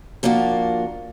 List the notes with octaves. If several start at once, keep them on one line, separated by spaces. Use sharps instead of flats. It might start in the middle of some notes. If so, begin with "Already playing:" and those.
F3 A#3 D4 F4 F#4